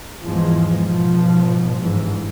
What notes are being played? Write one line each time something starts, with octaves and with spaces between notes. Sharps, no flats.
E2 G#2 F3 G#3
G#2 B2 F3
G1 G#2 E3